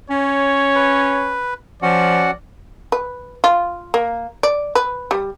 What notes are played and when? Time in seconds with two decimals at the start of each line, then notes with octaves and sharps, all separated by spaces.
0.10 C#4 C#5
0.75 B4
1.82 F3 C#4 F#4 D5 F#5
2.92 B4
3.44 F4
3.94 A#3
4.43 D5
4.75 B4
5.11 G3